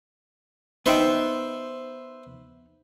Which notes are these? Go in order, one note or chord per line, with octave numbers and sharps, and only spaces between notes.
B3 D#4 B4 C5 E5 G5